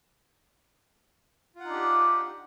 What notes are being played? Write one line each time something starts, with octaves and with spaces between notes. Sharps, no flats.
D4 D#4 F4 G4 F#5